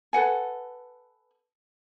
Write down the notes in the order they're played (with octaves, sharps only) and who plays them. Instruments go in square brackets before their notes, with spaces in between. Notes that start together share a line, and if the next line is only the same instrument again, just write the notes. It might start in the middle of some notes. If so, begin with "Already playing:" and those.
[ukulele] A4 B4 F#5 G#5